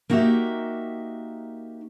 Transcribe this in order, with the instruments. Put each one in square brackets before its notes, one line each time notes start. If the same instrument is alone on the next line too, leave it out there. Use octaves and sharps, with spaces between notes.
[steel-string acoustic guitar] A#3 D#4 F#4 G4 E5